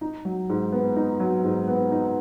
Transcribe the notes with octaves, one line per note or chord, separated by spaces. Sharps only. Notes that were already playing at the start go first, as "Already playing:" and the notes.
D#4
F#3
G#2
B3
D#4
F#3
G#2
B3
D#4